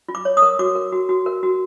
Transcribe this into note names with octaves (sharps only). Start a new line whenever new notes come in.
F4
D6
C#5
D#6
A#4
F#4 D6
A#4
F#4
F#4
A#4
F#4